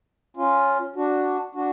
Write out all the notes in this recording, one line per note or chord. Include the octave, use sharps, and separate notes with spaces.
C#4 F4
D4 F#4
D4 F#4